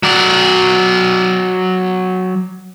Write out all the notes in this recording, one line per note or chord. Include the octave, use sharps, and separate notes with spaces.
F#3 D5